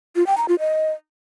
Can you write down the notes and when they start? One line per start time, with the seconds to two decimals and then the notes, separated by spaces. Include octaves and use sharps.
0.16 F4
0.27 G5
0.38 A#5
0.48 F4
0.59 D#5